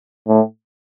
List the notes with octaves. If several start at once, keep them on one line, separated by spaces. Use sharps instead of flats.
A2